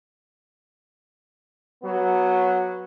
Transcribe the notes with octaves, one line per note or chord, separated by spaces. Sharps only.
F#3 B3